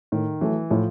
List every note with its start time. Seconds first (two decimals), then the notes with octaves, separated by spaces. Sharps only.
0.12 A2 D#3
0.41 E3 F#3 A3
0.70 A2 F3